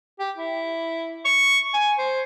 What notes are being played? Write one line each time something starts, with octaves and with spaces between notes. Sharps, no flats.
G4
E4
C#6
G#5
C5